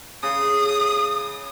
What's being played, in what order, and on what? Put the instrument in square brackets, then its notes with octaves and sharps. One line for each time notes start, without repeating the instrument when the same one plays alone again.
[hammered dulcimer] C#3 [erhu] D#6